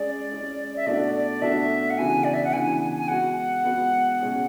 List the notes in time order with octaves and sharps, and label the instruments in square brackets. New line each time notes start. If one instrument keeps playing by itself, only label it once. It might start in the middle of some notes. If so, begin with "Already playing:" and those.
Already playing: [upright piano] G#3 C#4 G#4 [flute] D5
[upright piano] G#3 C#4 G#4
[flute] E5
[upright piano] B2 A3 D4 F#4 A4 [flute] D5
[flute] D5
[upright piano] B2 A3 D4 F#4 A4 [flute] E5
[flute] F#5
[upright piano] C#3 E3 B3 D4 F#4 [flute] G#5
[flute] D5
E5
F#5
[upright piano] C#3 E3 B3 D4 F#4 [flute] G#5
[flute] G#5
G#5
[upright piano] G#3 B3 F#4 [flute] F#5
[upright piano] G#3 B3 F#4
B2 G#3 C#4 G#4